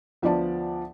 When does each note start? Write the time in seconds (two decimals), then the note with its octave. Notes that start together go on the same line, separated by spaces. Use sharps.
0.22 D2 F3 B3 D5 A5